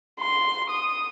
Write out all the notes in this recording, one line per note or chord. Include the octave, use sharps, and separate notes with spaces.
C6
D#6